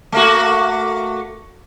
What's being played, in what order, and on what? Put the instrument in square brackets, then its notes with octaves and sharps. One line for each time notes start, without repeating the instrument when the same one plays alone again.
[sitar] A3 A#3 F#4